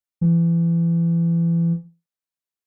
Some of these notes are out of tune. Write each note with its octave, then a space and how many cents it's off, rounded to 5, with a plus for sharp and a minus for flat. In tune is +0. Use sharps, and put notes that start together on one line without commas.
E3 +30